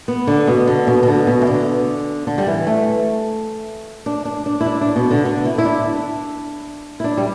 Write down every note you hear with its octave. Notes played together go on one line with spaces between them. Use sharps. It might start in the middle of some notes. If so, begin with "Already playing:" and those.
B3
D3
B2
D3
B2
B2
D3
B2
E3
D3
D3
G3
E3
A3
D4
D4
D4
E4
D4
D4
B2
D3
D3
E4
E4
D4
E4
D4
G3